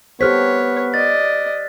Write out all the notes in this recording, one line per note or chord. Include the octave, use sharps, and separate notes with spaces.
B3 G4 A4 C5 C#5 F6 F#6 B6
D5 D#5 A6